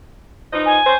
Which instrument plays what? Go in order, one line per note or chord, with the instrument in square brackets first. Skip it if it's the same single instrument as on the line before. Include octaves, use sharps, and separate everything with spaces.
[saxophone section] E3 F3 D#4
[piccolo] G#5
[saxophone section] C#4 C5